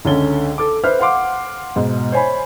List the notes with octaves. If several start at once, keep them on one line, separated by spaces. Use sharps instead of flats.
C#2 D3 C#4 A4 G7
A4 D6
B4 C5 E5 F6
F5 F#5 C6 D6
G#2 B2
C5 C#5 G#5 B5